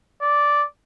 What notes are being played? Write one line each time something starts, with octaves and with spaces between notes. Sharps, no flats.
D5